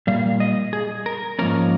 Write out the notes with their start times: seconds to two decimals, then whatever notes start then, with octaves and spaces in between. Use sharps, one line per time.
0.07 A#2 G3 F5
0.40 D#5
0.73 G#4
1.06 A#4
1.39 G#2 F3 A#3 C#4 A#4